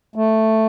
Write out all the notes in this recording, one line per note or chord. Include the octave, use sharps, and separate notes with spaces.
A3